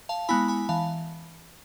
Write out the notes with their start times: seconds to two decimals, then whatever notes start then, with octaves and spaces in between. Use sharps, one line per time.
0.09 F5 A5
0.29 G#3 B3 E4 G#5 B5
0.48 G#5 B5
0.69 E3 F5 A5